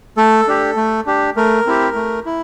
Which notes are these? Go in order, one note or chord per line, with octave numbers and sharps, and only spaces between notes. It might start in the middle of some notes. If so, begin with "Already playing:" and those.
A3 A4
D4 G4
A3
D4 G4
A3 A#4
C4 E4 G4
A3
E4